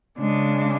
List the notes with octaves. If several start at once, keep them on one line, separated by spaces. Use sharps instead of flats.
C#3 G#3 D4